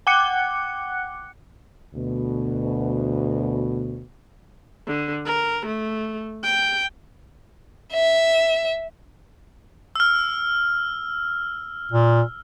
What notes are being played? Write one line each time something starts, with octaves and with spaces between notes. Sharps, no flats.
F#5 G5 D6 F#6 C#7
D2 B2
D3
A#4
A3
G5
E5
E6 F6
A#2